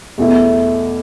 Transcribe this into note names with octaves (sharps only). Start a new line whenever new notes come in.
E2 B2 A3 E4